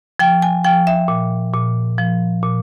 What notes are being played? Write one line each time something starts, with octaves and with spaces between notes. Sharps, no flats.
F3 G5
G#5
F3 G5
E5
A#2
A#2
F3
A#2